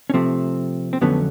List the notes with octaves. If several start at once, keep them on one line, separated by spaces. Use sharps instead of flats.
C#4
C3 F3 A3 C4
C4
F2 D3 F#3 A3 B3 C#4